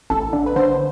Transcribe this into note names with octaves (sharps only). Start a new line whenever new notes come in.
A1 A4
D3
B4
D3 C5